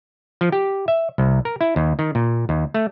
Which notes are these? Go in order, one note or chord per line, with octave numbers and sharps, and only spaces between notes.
F3
G4
E5
C2
A#4
E4
D#2
D#3
A#2
D#2
A3